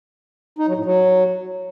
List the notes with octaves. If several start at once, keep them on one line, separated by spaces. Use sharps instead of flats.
D#4
F#3
A2
F#3